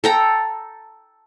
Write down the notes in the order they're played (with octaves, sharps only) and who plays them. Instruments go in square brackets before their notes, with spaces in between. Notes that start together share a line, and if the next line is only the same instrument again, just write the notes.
[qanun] A4 G5 A#5